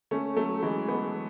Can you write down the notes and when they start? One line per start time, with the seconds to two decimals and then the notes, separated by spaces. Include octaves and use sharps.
0.11 A3 C#4
0.37 F#3 A3
0.62 E3 G#3
0.88 G#3 B3